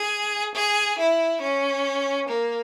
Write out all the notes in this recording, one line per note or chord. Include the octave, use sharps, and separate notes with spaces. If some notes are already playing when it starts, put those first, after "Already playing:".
Already playing: G#4
G#4
E4
C#4
A#3